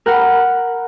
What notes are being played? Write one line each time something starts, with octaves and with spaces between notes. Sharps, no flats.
A#4 F#5 G5 B5